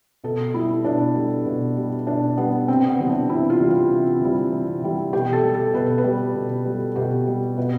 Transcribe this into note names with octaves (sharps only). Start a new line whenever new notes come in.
B2 A4
G3 E4
B2 D4
G3
B2
G3
B2 D4
G3 B3
C3 C4
B3
E3 G3
D4
C3 E4
F4
E3 G3
F4
C3
E3 G3
C3
E3 G3
B2 G4
A4
G3
A4
B2 B4
A4
B4
G3
B2
G3
B2 G4
G3
B2